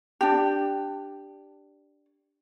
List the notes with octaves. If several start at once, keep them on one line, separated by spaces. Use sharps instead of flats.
D4 G4